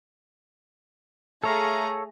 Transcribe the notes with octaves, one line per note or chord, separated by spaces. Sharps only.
A3 G#4 A4 C#5 F5 A#5